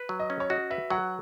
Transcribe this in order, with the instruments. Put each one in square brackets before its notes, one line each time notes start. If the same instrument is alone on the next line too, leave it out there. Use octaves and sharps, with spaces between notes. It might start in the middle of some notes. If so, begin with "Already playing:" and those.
Already playing: [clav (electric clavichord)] B4
F#3
[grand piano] D#5
[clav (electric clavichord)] C#4
[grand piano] C#5
[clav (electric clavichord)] F#4 [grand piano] D#5
[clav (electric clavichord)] B4 [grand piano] E5
[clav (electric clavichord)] F#3 [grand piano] F#5